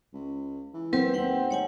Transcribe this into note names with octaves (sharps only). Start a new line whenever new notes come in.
C#2
E3
F#3 C4 A#4 B4
D#2 F#5 G5
G#2 C#5 F#5 G#5